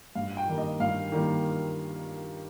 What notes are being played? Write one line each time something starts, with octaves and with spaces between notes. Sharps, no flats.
G2 F5
G5
D#3 G3 A#3
D#5
G2 F5
D#3 G3 A#3